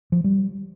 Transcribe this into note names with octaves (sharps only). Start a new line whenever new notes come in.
F3
G3